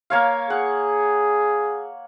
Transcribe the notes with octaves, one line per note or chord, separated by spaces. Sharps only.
A#3 C#5 F5
G#4 F#5